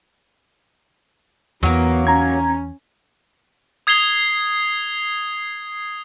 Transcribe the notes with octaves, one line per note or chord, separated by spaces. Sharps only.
E2 E3 F#3 A#3 B3
C#4 A#5 G#6
D#6 G#6 C7 F7 G7